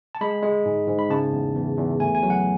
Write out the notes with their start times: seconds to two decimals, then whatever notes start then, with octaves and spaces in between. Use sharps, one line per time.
0.15 A5
0.21 G#3 B5
0.43 G#3
0.65 G#2
0.88 G#2
0.99 B5
1.10 C#3 A5
1.32 E2
1.55 E2
1.77 E2
2.00 A3 G#5
2.15 G#5
2.23 F#3
2.30 F#5